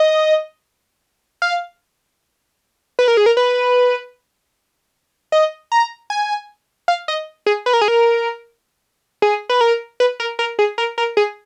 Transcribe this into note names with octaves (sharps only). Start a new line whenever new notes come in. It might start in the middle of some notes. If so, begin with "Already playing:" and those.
Already playing: D#5
F5
B4
A#4
G#4
A#4
B4
D#5
A#5
G#5
F5
D#5
G#4
B4
A#4
G#4
A#4
G#4
B4
A#4
B4
A#4
A#4
G#4
A#4
A#4
G#4